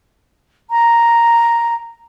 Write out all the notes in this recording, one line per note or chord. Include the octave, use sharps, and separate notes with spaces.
A#5